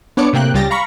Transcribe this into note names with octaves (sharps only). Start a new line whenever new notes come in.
B3 D4 C#5 D6 C#7
A2 C3 A#3 G5 F#6
C#2 C#3 G3 G4 A6 A#6
F5 A#5 B5 C#6